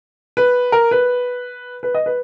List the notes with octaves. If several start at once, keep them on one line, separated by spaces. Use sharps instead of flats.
B4
A#4
B4
B4
D#5
B4